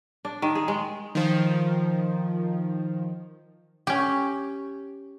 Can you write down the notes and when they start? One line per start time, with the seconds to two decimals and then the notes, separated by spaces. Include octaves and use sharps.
0.25 D4
0.42 D#3
0.55 G#4
0.68 G#3
1.15 D#3 F3
3.87 C#4 G4